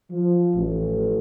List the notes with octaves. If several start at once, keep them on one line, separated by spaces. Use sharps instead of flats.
F3
A1